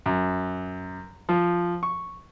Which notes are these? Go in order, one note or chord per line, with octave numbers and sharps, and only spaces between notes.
F#2
F3
C#6